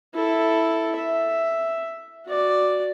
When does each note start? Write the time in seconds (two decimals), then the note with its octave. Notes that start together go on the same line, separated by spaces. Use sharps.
0.15 E4 A4
0.96 E5
2.27 F#4 D5